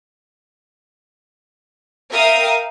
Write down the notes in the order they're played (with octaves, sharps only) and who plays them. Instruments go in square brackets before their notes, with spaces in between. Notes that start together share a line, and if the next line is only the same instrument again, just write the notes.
[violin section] A#4 E5 F5 G5 D#6